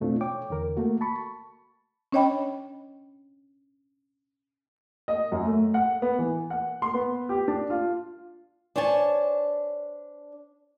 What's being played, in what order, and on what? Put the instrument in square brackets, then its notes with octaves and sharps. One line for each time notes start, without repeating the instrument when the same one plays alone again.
[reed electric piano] F2 B2 A3 C4 D4 F4
C#5 G5 D6
E2 D3 A#4
A3 A#3 F#4
A5 B5 C#6
[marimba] C#4 D4 C#5 D#5 G5 B5
[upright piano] D#5
F#2
A3
F#5
B3
E3
F#5
C6
B3
G4
D4
F4
[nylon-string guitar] D4 C5 C#5 G#5 A5